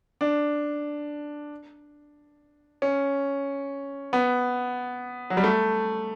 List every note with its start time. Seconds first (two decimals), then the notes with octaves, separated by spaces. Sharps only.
0.21 D4
2.82 C#4
4.13 B3
5.30 F#3
5.37 G3
5.44 A3